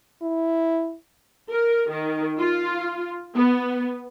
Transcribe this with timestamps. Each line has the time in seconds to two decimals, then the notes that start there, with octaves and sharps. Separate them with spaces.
0.22 E4
1.49 A#4
1.90 D#3
2.38 F4
3.34 B3